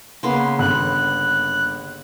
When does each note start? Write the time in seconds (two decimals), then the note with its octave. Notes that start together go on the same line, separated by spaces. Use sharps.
0.23 C#3 A#3 B3 C6
0.59 G1 F#6